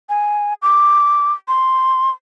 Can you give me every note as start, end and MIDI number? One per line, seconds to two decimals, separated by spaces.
0.09 0.54 80
0.62 1.32 86
1.48 2.11 84